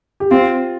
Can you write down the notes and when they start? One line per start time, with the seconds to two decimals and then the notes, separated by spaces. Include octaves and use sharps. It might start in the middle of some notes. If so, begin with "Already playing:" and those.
0.20 G4
0.31 C4 F4